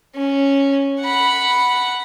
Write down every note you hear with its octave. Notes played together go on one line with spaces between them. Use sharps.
C#4
F#5 B5